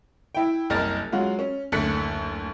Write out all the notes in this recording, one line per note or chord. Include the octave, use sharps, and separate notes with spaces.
E4 G5
F#1 C2 A#4 D#5 F6 A6
F#3 G#3 F4 F#4
C#4
F#1 D2 A4 F#6 B6 C#7